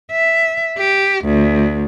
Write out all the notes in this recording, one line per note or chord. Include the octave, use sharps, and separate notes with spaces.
E5
G4
D2